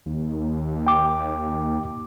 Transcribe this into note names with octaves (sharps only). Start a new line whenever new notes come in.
D#2
G5 D6